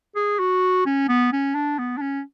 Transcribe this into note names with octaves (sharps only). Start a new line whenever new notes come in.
G#4
F#4
C#4
B3
C#4
D4
B3
D4
C#4